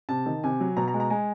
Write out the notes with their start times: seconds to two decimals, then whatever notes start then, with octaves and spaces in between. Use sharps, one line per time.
0.09 C3 A5
0.26 D#3
0.44 C3 G#5
0.60 F#3
0.77 B2 A#5
0.88 A#5
0.94 G#3
1.00 A#5
1.10 G#3 G#5